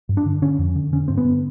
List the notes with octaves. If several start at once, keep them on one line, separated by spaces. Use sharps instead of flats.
G2
D4
D3
D3 C#4
F2
D3
D3 C#4
G2 C4
B3
D3